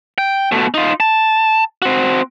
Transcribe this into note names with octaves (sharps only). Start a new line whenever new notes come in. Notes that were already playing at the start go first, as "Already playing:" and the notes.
G5
B2 A3
D#4 F4
A5
C4 F#4